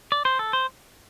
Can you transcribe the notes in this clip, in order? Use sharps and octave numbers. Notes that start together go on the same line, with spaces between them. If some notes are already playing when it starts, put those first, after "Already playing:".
D5
C5
A4
C5